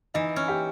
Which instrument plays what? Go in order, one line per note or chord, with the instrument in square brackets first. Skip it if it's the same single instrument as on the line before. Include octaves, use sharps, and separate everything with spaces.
[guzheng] E3 [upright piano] D#4
[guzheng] C#4
[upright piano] G4